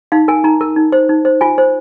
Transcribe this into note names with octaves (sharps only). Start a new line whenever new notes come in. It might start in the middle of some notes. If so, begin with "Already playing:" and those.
D#4 F5
A#4 G#5
D#4 A#5
A#4
D#4
C5
D#4
C5
F4 G#5
C5